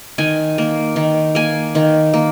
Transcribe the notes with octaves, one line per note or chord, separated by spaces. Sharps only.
D#3 G#5
A#3
D#3
A#3 G#5
D#3
A#3